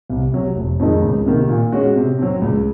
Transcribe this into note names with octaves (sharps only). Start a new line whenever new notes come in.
C2
C3 F#3
F1
F2 D#3 G#3 D#4
C#2
C3 D#3 A#3
A#2
G#3 C#4 F#4
C3
F#3 C4
C#2